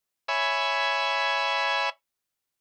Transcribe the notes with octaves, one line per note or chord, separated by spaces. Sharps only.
C#5 E5 G#5 B5